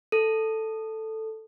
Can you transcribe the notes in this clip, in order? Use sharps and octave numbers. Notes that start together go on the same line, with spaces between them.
A4